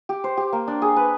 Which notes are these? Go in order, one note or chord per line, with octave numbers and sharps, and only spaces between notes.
G4
C5
G4
A#3
D4
G#4
B4